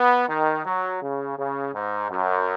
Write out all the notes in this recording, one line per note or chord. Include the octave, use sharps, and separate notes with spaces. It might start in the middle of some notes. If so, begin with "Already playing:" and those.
Already playing: B3
D#3
F#3
C#3
C#3
G#2
F#2